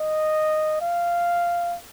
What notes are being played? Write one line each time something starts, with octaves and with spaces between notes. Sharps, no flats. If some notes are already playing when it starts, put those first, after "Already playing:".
Already playing: D#5
F5